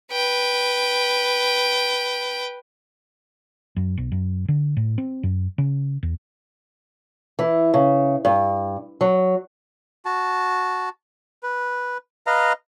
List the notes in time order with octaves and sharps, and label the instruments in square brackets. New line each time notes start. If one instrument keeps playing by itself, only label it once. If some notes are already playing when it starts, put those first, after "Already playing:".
[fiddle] B4 G5
[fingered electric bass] F#2
B1
F#2
D3
A2
C4
F#2
C#3
E2
[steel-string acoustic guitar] E3
C#3
G2
F#3
[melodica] F#4 A5
B4
B4 D#5 F5 A#5